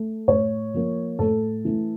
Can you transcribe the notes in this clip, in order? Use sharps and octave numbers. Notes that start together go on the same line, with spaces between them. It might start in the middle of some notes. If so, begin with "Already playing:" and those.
Already playing: A3
A2 C#5
F3 A#3
A2 A4
E3 A3